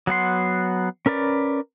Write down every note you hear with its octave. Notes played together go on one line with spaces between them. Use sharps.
F#3 B3 F#5 C6
C#4 A#4 B4 D5